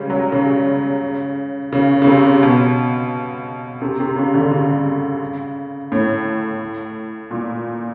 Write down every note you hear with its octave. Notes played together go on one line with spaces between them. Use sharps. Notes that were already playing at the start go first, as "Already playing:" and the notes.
Already playing: C#3 G3 G#3
F#3
C#3
C#3
C#3
C3
B2
C3
C3
C#3
D3
C#3
A2
A#2